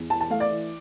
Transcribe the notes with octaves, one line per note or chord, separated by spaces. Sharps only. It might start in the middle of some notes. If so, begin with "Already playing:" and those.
Already playing: E2
E3 A5
A5
A3 F5
D5
E3